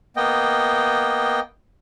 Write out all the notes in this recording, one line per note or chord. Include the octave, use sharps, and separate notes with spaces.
A#3 B3 D#5 G5